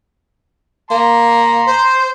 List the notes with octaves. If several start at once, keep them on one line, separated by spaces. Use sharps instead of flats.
A#3 A#5 C6
C5